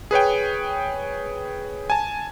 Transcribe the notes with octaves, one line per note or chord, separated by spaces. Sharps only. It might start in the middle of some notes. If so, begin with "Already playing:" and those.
G#4 B4 C#5 G5
G#5 A5